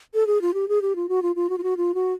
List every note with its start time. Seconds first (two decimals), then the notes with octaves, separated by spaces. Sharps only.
0.14 A4
0.27 G#4
0.41 F4
0.54 G4
0.68 G#4
0.82 G4
0.96 F4
1.09 F#4
1.22 F4
1.36 F4
1.49 F#4
1.58 F4
1.63 F#4
1.77 F4
1.94 F#4